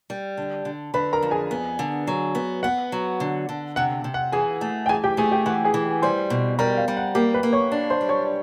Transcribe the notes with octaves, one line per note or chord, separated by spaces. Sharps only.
G3
D3
D3
D3 B4 B5
A#4 A#5
F2
G#4 G#5
B3
D3
F#3
B3
B3 F#5
F#3
D3
D3
C3 F#5
C3
F#5
E3 G#4 G#5
A3
G5
E3 G#4 G#5
G4 G5
A3 G#4 G#5
G4 G5
E3 F#5
G#4 G#5
E3
G3 C5 C6
B2
G3 A#4 A#5
F5
G3
F#5
A#3 G4 G5
B4 B5
A#3
C#5 C#6
D4
C5 C6
G3
C#5 C#6